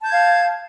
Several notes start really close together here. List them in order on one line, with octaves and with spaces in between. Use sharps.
A5 G6 G#6 F5